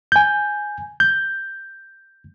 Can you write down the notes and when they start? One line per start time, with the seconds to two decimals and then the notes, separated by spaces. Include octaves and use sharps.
0.12 G#5 G6
1.00 G6